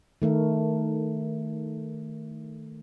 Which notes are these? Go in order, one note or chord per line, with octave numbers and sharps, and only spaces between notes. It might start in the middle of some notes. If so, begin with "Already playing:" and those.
D#3 A3 A#4